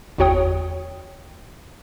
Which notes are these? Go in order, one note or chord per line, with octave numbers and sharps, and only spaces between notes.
G1 E2 F#4 C#5 G5 D#6